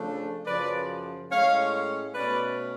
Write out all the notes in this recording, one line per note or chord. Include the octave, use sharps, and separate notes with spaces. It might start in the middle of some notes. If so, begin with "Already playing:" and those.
Already playing: C#3 F3 A3 D4
F#2 C#3 F3 B4 D5
A2 G#3 C#4 C#5 F5
B2 A3 C#4 B4 D5